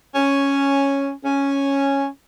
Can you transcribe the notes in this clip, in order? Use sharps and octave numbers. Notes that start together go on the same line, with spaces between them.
C#4
C#4